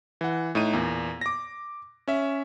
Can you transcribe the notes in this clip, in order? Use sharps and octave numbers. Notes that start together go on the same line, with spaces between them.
E3 F#5
A2 D#4 D#7
E2 A#2
D6 A#6
C#4 E5